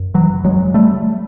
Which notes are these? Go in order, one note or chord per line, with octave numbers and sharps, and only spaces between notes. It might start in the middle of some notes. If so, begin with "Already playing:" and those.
Already playing: F#2
E3 F#3
F#3 G#3
G3 A3